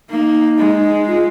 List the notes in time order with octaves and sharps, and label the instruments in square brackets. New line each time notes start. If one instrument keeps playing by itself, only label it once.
[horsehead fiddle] A#3 [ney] D#4
[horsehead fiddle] G#3
[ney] F4